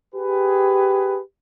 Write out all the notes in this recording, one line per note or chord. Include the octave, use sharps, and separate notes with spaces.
G4 G#4 B4